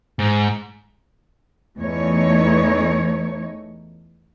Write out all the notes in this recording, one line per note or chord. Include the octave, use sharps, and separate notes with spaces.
G#2
E2 A3 D#4 C#5